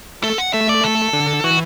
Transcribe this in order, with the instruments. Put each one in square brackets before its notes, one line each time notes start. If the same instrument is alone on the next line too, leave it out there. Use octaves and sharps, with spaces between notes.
[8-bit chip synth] A3 [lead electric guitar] A4
[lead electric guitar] F#5
[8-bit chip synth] A3 [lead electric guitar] E5
[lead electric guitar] D5
A4
[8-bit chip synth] D3
[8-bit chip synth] E3 [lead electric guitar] F#4